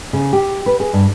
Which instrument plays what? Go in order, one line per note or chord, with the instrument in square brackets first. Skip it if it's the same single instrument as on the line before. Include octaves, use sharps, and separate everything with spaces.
[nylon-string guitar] C#3
G4
B4
G#4
G2